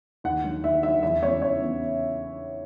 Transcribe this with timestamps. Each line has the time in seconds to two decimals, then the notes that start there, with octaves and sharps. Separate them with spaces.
0.24 D#2 F#5
0.44 D#3 F#3
0.64 D#2 E5
0.82 D#3 F#3 E5
1.03 E2 E5
1.22 C#3 E3 B3 C#5
1.42 E2 C#5
1.61 C#3 E3 B3